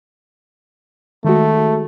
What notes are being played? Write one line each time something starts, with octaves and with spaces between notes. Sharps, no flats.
D#3 G#3 A3 F#4